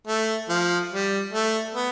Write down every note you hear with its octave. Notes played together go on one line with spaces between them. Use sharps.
A3
F3
G3
A3
B3